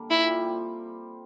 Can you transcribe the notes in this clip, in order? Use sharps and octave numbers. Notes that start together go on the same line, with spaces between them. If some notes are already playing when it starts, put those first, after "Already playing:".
Already playing: D3 G3 A#3
A#2 E4
G3
C4